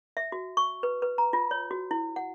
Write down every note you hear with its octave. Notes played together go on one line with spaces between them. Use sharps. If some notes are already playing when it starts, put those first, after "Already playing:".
E5
F#4
C#6
B4
B4
A#5
F4
C#5
F#4
E4
F#5